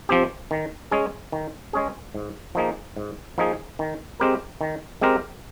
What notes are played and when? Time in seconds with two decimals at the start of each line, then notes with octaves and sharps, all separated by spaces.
0.09 F3 C4 G4
0.51 D#3
0.91 G#3 C#4 G#4
1.32 D#3
1.73 G#3 C#4 G#4
2.15 G#2
2.55 F3 A#3 D#4 G#4
2.97 G#2
3.38 F3 A#3 D#4 G#4
3.79 D#3
4.20 G#3 C4 G4 A#4
4.61 D#3
5.01 G#3 C4 G4 A#4